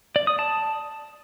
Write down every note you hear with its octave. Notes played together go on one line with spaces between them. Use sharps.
D5
D#6
A5